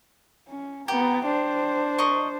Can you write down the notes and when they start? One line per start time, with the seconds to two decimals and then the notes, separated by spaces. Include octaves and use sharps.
0.48 C#4
0.88 B3 G4 A#5
1.25 D4 C5
1.98 A#4 D#5 C#6